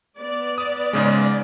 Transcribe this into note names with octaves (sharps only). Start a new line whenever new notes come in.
B3 D5
D#6
G#2 C#3 G#3